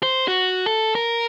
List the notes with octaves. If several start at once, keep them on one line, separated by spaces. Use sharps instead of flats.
C5
F#4
A4
A#4